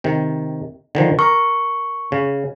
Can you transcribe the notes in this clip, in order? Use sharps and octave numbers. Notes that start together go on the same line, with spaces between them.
C3 D#3
D3 D#3 F3
A#4 C#6
C#3